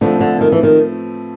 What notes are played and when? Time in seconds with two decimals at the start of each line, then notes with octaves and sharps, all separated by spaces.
0.01 A2 D3 F3 A3 C4
0.20 D3
0.41 D#3
0.52 E3
0.63 D#3